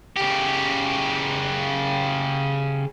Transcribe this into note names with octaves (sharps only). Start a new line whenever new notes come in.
C#3 G4